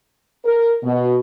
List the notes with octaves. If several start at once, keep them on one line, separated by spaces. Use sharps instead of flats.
A#4
B2